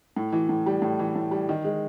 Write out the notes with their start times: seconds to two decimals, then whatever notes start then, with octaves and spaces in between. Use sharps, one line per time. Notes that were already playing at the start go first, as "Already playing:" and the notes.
0.16 A2
0.32 E3
0.49 A2
0.66 G3
0.82 A2
0.99 E3
1.15 A2
1.31 G3
1.49 D#3
1.64 G#3